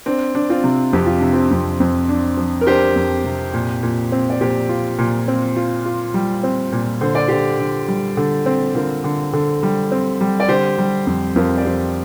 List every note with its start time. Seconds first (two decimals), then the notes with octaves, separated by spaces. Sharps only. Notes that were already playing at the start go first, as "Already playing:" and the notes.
0.06 C4 D4
0.35 D4
0.49 C4 F4
0.64 C3
0.93 F2 G4
1.06 F4
1.20 C3 D4
1.33 C4 F4
1.51 F2
1.80 F2
2.09 D4
2.37 F3
2.61 A#4
2.67 D4 G4 C5
2.96 F2
3.24 C3
3.54 A#2
3.83 A#2
4.12 C4
4.30 D5
4.41 A#2 G4 C5
4.69 F4
4.99 A#2
5.28 C4
5.56 F4
5.85 F4
6.14 G3
6.43 C4
6.72 A#2
7.01 D3 C5
7.15 D5
7.28 D3 G4 C5
7.59 D3
7.88 G3
8.17 D3
8.46 C4
8.75 D3 F4 A#4
9.04 D3
9.33 D3
9.63 G3
9.92 C4
10.21 G3
10.40 D5
10.49 D3 G4 C5
10.78 G3
11.07 F2
11.36 F2 F4 A#4
11.57 D5
11.65 F2 G4 C5